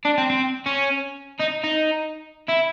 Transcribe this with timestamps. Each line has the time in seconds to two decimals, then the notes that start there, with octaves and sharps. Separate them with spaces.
0.05 D4
0.18 C4
0.30 C4
0.66 C#4
1.39 D#4
1.64 D#4
2.48 E4